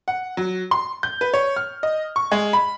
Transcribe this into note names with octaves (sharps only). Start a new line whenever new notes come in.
F#5
F#3
C6
G6
B4
C#5
F6
D#5
C#6
G#3
B5